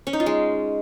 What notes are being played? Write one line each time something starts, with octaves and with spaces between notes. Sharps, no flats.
C#4
D#4
F4
G#3